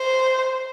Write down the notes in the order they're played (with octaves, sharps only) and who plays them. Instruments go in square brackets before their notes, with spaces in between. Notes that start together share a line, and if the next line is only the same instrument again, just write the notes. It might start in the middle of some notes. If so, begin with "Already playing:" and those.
Already playing: [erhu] C5